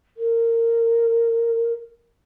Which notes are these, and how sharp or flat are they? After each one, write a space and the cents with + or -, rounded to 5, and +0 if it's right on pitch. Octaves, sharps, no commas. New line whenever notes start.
A#4 -20